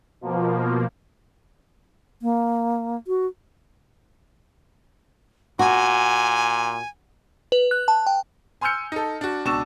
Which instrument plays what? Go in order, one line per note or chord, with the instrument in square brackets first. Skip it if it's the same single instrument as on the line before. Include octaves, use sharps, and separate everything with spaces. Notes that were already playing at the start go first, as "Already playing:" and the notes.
[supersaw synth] B2 F3 A#3
[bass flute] A#3
F#4
[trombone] A#2 [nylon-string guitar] F#4 [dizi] G#5
[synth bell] B4
F#6
A5
G5
[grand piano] G#5 C6 E6 F6 G6 C#7
D#4 A4
D4 F#4
C#2 B2 D4 C#6 E6 E7